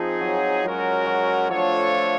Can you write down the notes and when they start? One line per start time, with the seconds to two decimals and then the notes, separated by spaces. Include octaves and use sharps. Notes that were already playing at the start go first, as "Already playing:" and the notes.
Already playing: F3 C4 D#4 G#4
0.21 F#3
0.64 F#3 G#3 C#4 F#4 A#4
1.06 F#3
1.49 F3 A3 D4 F4 A4 C#5